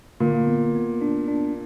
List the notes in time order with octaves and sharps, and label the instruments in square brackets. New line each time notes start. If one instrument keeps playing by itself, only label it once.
[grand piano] A#2 [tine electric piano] D3
[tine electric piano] B3
B3
D4
D4